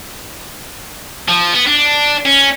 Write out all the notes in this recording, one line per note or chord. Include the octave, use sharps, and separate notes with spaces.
F3
B3
D4
C#4